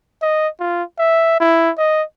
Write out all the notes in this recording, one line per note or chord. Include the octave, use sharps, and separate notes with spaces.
D#5
F4
E5
E4
D#5